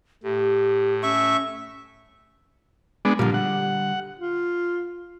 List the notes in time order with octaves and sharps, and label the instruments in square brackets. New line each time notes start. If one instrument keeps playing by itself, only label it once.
[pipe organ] A2 [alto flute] G4
[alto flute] C#4 [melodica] E5 C#6
[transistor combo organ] G#3 B3 D4
[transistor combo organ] A#2 F3 [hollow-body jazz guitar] D3 G3
[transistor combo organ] F#5
[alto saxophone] F4